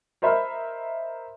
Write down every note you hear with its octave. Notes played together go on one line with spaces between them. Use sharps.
A#4 C5 D#5 E5 B5 F6